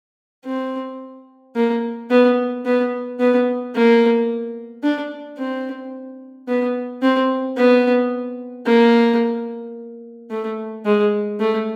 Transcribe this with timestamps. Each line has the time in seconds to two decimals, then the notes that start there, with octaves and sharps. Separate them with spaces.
0.45 C4
1.56 A#3
2.10 B3
2.65 B3
3.20 B3
3.75 A#3
4.83 D4
5.38 C4
6.48 B3
7.02 C4
7.57 B3
8.66 A#3
10.30 A3
10.85 G#3
11.40 A3